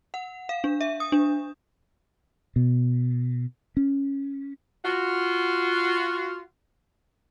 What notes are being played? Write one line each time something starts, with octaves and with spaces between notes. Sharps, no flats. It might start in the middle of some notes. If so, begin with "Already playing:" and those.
F#5
F5
D4
E5
D#6
D4
B2
C#4
F4 F#4